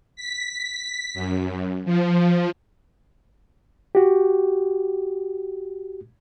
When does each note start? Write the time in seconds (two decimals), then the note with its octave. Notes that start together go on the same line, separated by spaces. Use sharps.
0.16 B6
1.14 F#2
1.85 F3
3.95 F#4 G4